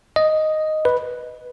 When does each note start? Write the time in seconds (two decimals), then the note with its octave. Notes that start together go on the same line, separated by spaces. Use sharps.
0.16 D#5
0.85 B4